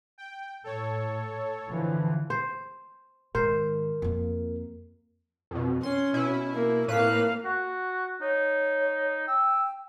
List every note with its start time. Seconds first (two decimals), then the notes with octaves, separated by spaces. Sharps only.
0.18 G5
0.64 A2 A4 C#5
1.70 D3 E3 F3
2.30 C5
3.35 G#2 D#3 A#4 C5
4.02 F2 A#3
5.51 F2 B2
5.83 C#4 C6
6.14 B2 E4
6.54 A#3
6.88 A2 A#3 B4 F5 F#6
7.45 F#4
8.21 D#4 C#5
9.28 G5 E6